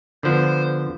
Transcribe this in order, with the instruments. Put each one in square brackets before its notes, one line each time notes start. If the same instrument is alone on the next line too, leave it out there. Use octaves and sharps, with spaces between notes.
[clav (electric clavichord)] D3 F3 B3 [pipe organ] C5